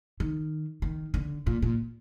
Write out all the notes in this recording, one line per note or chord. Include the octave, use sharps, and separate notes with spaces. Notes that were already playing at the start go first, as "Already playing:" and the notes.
D#3
D#3
D3
A#2
A#2